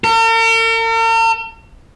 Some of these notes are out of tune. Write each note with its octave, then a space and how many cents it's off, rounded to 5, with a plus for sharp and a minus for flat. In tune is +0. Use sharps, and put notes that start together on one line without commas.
A#4 -45